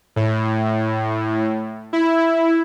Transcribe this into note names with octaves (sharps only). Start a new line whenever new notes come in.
A2
E4